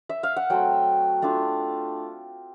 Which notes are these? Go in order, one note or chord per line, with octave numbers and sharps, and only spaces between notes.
E5
F5
F#5
F#3 A3 C4 G5
A3 D4 F4